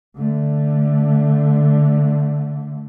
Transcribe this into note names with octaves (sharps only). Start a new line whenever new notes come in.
D3 A3